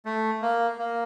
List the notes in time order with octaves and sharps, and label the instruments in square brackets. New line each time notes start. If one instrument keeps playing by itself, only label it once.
[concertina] A3
A#3
A#3